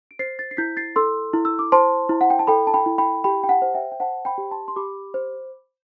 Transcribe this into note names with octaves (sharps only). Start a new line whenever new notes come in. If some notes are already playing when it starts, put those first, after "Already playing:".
D7
C5 A6 C7
A6 C7
C7
E4 G6 B6
A6 C7
A4 C6 E6
E4
E6
D6
C5 A5 C6
E4
F#5
G5
A5
A4 G5 B5
A5
G5 B5
E4
G5 B5
G4 G5 B5
G5
F#5 A5
C5
E5 G5
G5
C5 F#5 A5
G5 B5
G4
A5 C6
C6
G4 B5 D6
C5